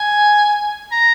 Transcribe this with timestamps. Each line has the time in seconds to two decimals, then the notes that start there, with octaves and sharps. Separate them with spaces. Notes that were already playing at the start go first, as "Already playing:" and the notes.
Already playing: G#5
0.92 A#5